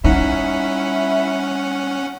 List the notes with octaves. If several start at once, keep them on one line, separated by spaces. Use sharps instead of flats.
G3 C#4 D#4 E4 F#5